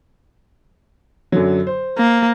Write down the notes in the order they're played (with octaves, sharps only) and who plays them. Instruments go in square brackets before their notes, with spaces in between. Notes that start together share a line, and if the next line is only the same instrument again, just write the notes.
[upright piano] F#2 D3 F#3
C5
[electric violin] A#3